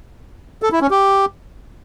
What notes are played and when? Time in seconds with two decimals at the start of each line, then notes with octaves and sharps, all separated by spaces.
0.63 A4
0.72 E4
0.81 C#4
0.91 G4